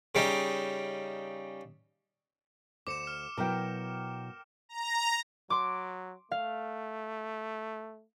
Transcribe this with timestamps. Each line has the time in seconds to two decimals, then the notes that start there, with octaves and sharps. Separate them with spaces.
0.15 C#3 G3 D#4
2.87 D2 C5 D6 C#7 E7
3.07 F6
3.37 B2 F#3 E4 A#4 G5
4.69 A#5
5.50 F#3 C6 D6
6.31 A3 F5